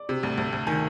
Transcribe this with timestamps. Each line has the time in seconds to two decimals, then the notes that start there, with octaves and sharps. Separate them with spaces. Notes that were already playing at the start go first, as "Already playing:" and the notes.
Already playing: D5
0.09 C3
0.23 D2
0.38 D2
0.53 D2
0.67 D#3 G#5